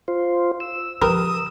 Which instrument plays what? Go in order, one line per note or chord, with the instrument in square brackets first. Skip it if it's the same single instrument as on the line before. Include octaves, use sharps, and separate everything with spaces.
[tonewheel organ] F4 C5
E6
[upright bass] C#3 F3 [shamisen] G4 A#4 B4 [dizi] D#6